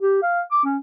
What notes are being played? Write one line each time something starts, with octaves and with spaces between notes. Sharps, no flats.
G4
F5
D6
C#4